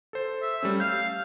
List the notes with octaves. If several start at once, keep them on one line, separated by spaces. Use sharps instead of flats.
A4 C5
E5
G3 A3 C#4
F5 G6